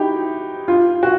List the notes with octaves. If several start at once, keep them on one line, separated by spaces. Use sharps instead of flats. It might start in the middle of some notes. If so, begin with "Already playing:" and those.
Already playing: D#4 E4 F#4 G4
F4
F#4